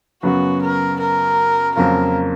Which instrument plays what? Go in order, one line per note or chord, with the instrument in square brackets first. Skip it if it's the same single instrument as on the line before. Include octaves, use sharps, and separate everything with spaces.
[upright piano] F#2 C#3 F#3 B3 [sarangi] F#4
[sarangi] A#4
A#4
[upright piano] F2 C#3 F#3 A#3 F4 [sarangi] A#4